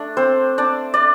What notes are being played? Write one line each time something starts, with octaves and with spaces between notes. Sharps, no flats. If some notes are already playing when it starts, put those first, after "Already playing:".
Already playing: A3 D4
C4 C5
D4 D5
D5